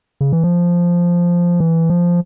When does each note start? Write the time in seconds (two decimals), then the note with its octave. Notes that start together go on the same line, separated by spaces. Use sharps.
0.21 C#3
0.33 E3
0.44 F3
1.60 E3
1.90 F3